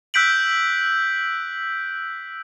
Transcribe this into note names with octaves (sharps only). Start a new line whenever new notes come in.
E6 F#6 G6 B6 D7 F#7